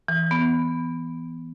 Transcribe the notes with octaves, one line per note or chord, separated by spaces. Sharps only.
E3
B3